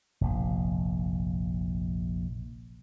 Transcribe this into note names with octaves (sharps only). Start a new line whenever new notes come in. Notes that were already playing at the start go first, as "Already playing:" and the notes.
F1 A#1